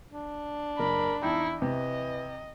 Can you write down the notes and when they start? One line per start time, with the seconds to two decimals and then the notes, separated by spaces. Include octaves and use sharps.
0.13 D4
0.79 F#1 A#4 B5
1.22 E2 D#4 E4 G5 A5
1.62 C3 E3 D#5